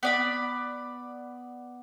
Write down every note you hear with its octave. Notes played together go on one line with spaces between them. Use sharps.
B3 D5 B5